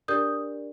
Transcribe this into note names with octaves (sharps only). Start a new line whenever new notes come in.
D4 G4 A#4 D5 D#6 G6